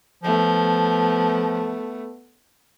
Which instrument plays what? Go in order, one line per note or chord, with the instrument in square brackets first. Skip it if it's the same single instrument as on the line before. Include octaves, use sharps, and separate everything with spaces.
[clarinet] F3 [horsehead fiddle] A3 B3